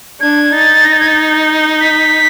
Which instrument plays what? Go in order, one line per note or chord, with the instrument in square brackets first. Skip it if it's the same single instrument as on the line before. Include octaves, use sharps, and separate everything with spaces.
[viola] D4 [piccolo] G#6
[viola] D#4 [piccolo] A6
[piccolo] A#6
A6
G#6
A6
B6